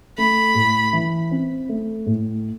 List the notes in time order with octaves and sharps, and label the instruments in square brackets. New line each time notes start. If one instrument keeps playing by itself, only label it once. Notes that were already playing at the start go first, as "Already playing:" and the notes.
[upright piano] A3 [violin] B5
[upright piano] A2
E3
C4
A3
A2